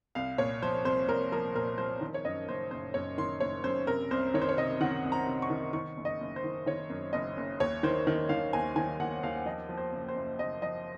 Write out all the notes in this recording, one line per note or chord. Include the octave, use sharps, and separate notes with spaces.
C2 F5
A#2 C#5
F3 C5
C2 C5
C2 A#4
F3 A#4
A#2 A#4
F3 C5
D#3
C#5
F#2 D#5
F#1 C5
F#1 C5
F#2 C#5
D#3 C6
F#1 C#5
F#2 C5
C3 A#4
C2 C5
D#3 C#5
C5
C#5
C3 D#5
D#3 F#5
C2
A#5
C3
C#6
D#3
D#3 C#6
F#1
D#5
F#1
C5
D#3
D#3 C#5
F#2
F#1 D#5
F#1
D#2 C#5
D#3 C5
D#3
D#3 F5
D#2 G#5
D#3 G#5
D#2 F#5
D#2 F5
F3 D#5
F3
C5
F#1
C5
F#1
F#1 D#5
F3 D#5